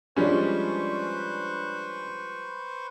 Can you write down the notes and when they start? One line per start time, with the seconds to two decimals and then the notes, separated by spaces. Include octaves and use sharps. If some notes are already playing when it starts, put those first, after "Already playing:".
0.16 F3 G3 G#3 C#4 D4 B4 C5 C#6